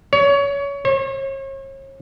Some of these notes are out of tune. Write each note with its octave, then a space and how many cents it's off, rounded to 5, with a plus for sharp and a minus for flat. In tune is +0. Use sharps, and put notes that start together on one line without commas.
C#5 +25
C#5 -40